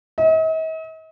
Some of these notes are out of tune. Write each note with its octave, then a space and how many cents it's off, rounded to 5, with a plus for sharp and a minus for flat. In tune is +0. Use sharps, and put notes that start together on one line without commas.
D#5 +45